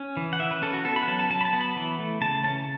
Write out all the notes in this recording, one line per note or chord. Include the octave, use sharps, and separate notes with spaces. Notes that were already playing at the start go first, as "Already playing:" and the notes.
Already playing: C#4
E3
F#5
E3 E5
B4
C#4 A4
F#4
B3 A4
B5
F#5
F#3 A5
A5
F#3 A5
B5
A5
B3
B5
E3
A3
C#3 A5
C#4 A5